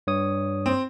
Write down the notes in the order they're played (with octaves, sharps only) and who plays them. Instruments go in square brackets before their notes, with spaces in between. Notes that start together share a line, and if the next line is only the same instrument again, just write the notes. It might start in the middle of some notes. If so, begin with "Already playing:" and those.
[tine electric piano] G2 C#5 D#6
[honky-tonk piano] C4